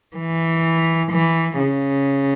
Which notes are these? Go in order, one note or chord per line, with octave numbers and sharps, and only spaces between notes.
E3
E3
C#3